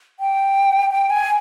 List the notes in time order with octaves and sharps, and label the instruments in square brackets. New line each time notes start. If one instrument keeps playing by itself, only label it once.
[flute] G5
G5
G#5